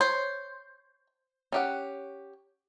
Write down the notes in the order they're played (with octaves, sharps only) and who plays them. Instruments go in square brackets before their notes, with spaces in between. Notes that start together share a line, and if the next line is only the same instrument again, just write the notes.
[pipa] C5 [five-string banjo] C#5
[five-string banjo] C#4 G4 F#5